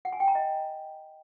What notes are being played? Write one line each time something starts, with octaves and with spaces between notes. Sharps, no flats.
F#5
G#5
G5
A#5
D#5